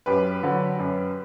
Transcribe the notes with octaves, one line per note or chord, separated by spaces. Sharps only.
F#2 G4 B4
D3 F#3
F#2